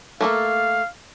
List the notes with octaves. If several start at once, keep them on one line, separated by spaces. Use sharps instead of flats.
A3 A#3 A4 F5